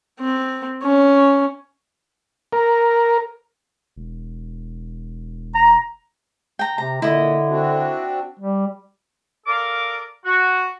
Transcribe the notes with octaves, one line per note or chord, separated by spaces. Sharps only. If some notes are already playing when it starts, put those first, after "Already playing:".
C4
C#4
A#4
E1
A#5
G5 A#5
C3 A#5
A#2 D3 E4 D#5
C4 D4 F#4
G3
A4 A#4 D5 F5 D6
F#4